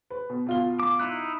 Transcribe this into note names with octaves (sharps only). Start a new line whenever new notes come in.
B4
B2
B2 F4 G7
D6
D#4 E4 F#6